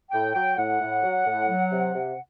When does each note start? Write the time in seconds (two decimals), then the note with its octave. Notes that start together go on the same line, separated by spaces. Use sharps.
0.12 A2 G5
0.34 F#3 G5
0.57 A2 F#5
0.80 A2
1.03 F#3
1.25 A2
1.48 F#3
1.71 C3
1.93 C3